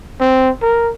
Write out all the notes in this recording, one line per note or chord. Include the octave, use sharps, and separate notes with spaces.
C4
A#4